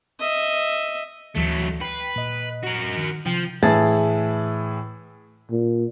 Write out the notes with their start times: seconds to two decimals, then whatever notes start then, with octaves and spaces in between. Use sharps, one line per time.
0.20 D#5 E5
1.35 D2 E3 F#3 A3
1.81 B4 G5 C7
2.16 A#2 D#5
2.64 F#4 A#4
2.97 D#3
3.26 C3 F3 G5 G6
3.63 A2 E3 E4 G#4 A5 A6
5.51 A#2